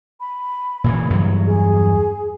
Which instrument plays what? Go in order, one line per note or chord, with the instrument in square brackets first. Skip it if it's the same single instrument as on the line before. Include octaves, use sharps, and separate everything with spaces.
[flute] B5
[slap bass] A#2 C#3 E3
E2 G2 F#3
[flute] G#4